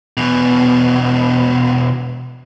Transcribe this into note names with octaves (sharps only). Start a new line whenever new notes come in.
E2 B2